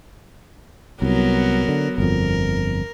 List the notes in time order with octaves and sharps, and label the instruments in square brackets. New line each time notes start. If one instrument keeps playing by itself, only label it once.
[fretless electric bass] C2 [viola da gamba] F#3 B3 A#4
[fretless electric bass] D3
[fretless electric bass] G1 F2 [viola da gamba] A#4